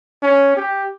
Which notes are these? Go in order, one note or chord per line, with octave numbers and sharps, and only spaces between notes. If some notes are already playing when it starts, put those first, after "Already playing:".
C#4
G4